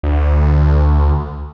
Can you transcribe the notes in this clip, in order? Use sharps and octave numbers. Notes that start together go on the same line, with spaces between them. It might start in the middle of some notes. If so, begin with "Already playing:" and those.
D2